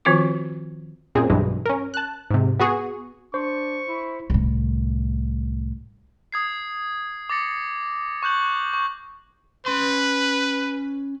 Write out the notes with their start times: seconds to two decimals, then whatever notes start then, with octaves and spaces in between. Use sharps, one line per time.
0.05 D#3 F3 C4 F4 F#4 D6
1.15 F#2 A#2 C4 G#4
1.30 B1 G2 E3 G#3
1.66 C#4 A#4
1.94 A5 F#6
2.30 G#2 C3
2.59 B3 F#4 G#4 C#6
3.34 D4 C5 C#6
3.88 E4
4.30 C2 A2
6.32 D#6 G#6 C7
7.30 D6 A6 A#6 C#7
8.23 C#6 F#6 G6 F#7
8.73 C#6
9.66 C#4 B4 C6